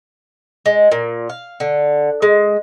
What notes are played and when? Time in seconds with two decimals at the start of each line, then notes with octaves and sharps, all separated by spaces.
0.66 G#3
0.92 A#2
1.29 F5
1.60 D3
2.22 G#3